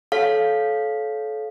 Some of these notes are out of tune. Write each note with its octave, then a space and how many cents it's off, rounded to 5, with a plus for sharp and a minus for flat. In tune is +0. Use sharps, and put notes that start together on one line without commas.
A4 -25 C#5 +0 F5 +0